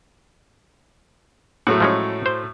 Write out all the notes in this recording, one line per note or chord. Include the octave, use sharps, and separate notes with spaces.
A2 F#3 A3 F#5
F3 G#3 C#4
C5